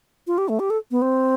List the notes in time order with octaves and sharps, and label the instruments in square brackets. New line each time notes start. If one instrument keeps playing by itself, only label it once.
[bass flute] F4
G4
A3
G4
A4
B3
C4